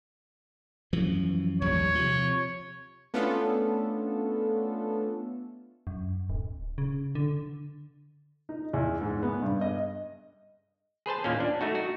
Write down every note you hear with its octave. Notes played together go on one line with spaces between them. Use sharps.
F#2 E3 F3
A#1 D#2 G3 C#5
C3 F3
A3 B3 C#4 D4 F4 A4
F#2
D1
C#3
D3
D#4
E2
G#2
B3
G2
D#5
G#4 B4 C5 A5
D#2 A#2 A#3 C#4
D4
A3 D#4 F#4
F#4